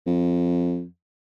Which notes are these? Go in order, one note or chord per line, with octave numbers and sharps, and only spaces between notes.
F2